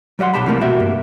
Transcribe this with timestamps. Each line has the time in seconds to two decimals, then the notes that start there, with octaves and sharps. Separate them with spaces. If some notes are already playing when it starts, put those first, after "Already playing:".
0.19 F#3 G3 D#5 F#5 C6
0.34 B1 G4 A5 B5
0.46 C3 E3 G3 A3 A#3
0.61 C2 B2 F#4 G4 E5
0.80 G2 A#3